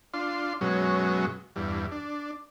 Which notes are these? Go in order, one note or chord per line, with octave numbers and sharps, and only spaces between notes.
D4 F4 C6
F#2 B2 F#3 G#3 C#4
E2 G2
D4